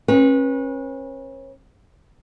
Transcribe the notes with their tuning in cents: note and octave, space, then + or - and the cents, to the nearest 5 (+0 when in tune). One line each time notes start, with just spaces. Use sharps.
C#4 -35 B4 -30